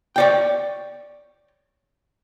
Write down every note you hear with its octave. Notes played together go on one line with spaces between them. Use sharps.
C#5 D5 G5